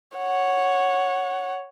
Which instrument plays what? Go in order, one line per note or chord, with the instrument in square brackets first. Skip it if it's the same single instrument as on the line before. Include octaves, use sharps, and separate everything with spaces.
[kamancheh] C#5 F#5